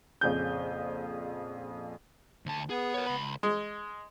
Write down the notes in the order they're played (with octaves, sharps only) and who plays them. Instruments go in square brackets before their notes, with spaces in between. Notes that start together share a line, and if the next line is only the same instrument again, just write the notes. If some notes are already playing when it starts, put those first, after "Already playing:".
[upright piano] A#1 F2 C#3 G6
[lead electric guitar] D2 A5
[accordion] B3 [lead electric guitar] G#4
[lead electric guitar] A#4 C#5
C#2 B5
[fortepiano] G#3